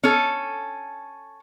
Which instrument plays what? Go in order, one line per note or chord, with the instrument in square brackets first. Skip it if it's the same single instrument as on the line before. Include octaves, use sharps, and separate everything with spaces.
[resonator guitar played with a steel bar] C#4 A4